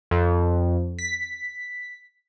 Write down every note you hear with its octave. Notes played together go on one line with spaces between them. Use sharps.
F2
B6